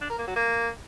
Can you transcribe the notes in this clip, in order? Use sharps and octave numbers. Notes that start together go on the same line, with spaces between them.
D4
A#4
A#3
F#3
A#3